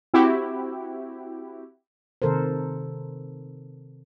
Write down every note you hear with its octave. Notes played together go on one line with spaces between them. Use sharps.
C4 E4 F#4 G4
C3 D#3 A4 A#4 C5